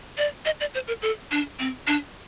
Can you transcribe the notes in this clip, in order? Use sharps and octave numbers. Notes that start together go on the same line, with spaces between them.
D5
D#5
D5
C5
A#4
A4
D4
C4
D4